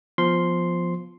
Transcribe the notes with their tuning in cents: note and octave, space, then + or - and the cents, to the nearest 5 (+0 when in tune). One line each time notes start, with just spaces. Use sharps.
F3 +0 B3 +0 C6 +0